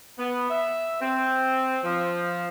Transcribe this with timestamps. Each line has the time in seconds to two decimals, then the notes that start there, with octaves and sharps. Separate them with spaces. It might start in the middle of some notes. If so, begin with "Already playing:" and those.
0.18 B3
0.49 E5
1.01 C4
1.84 F3